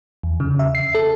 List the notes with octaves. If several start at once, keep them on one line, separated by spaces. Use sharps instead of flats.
E2
C#3
E5
C7
A4